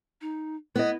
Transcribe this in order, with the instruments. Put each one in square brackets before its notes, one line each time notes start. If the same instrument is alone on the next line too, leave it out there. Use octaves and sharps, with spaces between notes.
[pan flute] D#4
[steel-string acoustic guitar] B3 D#5 [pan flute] E4